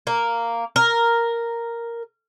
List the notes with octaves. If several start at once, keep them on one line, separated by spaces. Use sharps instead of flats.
A#3
A#4